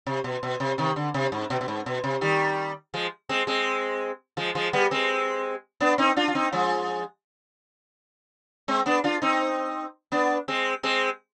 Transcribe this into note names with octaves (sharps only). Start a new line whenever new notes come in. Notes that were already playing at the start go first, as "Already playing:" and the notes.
C3
B2
B2
C3
C3 D#3
D3
C3
G#2
B2
B2
G#2
B2
C3
D#3 G3
F3 G#3
G#3 C4
G#3 C4
F3 G#3
F3 G#3
G3 B3
G#3 C4
B3 D4
C4 D#4
D4 F4
F4
C4 D#4
F3 G#3
G#3 C4
B3 D4
D4 F4
C4 D#4
B3 D4
G#3 C4
G#3 C4